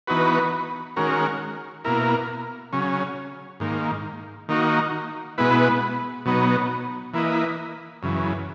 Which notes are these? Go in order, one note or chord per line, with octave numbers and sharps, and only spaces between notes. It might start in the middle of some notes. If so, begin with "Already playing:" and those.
E3 B3 D#4 F#4 B4
D#3 G#3 C#4 F#4 A#4
B2 A#3 E4 A#4
C#3 F#3 C#4
G#2 D#3 A#3
D#3 A#3 D#4 F#4
B2 G#3 B3 E4 B4
B2 F#3 B3 D#4
E3 A#3 E4 B4 D#5
F#2 C#3 E3